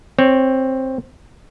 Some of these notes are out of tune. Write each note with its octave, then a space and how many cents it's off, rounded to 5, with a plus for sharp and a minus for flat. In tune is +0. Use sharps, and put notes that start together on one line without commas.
C4 +10 C#5 +0